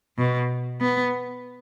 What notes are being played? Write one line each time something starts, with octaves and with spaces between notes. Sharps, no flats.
B2
B3